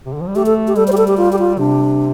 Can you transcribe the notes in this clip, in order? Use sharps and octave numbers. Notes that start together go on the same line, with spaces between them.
C3
D3
F3
G3
A3 G4
A4
G4
G3 A4
C5
G4
A4
G4
F4
G4
F4
C3 D4